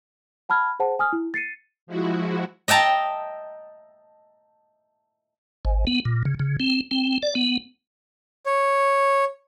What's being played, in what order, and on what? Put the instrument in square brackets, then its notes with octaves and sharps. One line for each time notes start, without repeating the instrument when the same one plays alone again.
[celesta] F#5 A5 B5 F6 G#6
G#4 C5 F#5 A5
G#5 D#6 F6
E4
A6 C7 C#7 D#7
[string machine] F3 G#3 E4 F#4
[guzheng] D#5 E5 G5 A5 A#5
[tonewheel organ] G#1
B3
A#2
C#3
C#3
C4
C4
D5
B3
[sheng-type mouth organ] C#5